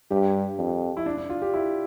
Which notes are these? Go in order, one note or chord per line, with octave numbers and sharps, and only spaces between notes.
G2 G4
F2
E4
D4
D4
F4
G4
E4